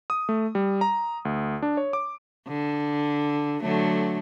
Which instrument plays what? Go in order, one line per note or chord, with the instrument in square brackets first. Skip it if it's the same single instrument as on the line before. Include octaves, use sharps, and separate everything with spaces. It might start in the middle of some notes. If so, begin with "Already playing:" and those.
[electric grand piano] D#6
A3
G3
A#5
D2
D4
C#5
D6
[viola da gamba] D3
D3 F#3 A3